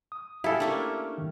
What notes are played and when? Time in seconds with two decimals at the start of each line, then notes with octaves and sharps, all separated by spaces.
0.12 D#6
0.44 E4 G4 A4 F5 G#5
0.60 A3 A#3 C#4 D4
1.18 G2 D#3